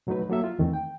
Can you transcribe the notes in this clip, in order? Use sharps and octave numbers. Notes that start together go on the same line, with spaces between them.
B2 F#3 A3 D#4 B4
F#3 A#3 A4 E5
F4
E2 D#3 E3 A3 C4
G5